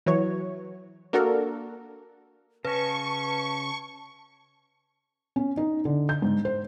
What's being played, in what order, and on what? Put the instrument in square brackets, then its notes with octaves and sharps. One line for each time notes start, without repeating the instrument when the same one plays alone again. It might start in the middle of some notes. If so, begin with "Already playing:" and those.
[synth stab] E3 F#3 C#5
A#3 D4 F#4 A4 A#4
[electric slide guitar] C#3 C#4 [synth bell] B4 [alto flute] A5 [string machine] C#6
[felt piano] C#4
D#4
D3
G6
G#2
C5